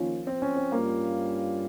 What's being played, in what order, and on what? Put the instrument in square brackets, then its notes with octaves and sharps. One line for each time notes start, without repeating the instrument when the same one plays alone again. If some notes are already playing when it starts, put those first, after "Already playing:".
Already playing: [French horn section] D#3 A#3 C#4 F4 [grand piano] F3
[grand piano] C4
C#4
C4
[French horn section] G2 G3 C#4 F4 [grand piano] A#3